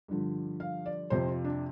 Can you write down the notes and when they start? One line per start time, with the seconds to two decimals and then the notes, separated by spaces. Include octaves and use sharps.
0.08 G2 D3 F3
0.60 F5
0.86 D5
1.10 F2 C3 F3 C5
1.28 F4
1.44 D4